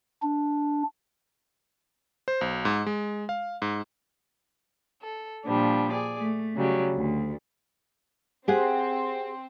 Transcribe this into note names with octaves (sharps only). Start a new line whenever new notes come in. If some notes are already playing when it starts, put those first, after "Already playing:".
D4
C5
B1
G#2
G#3
F5
G#2
A4
A#2 F3 G3 D4
G#4 D5
A3
C#3 F#3 G3
D2
C4 G4 G#4 F#5